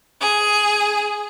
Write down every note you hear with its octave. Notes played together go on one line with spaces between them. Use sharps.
G#4